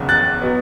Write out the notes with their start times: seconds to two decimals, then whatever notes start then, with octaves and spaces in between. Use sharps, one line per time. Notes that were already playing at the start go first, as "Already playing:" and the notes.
Already playing: F#1 E2 C#3
0.09 F#6 A6
0.42 B2 F#3 B3